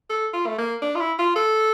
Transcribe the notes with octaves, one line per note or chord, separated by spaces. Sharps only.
A4
F4
A3
A#3
D4
F4
E4
F4
A4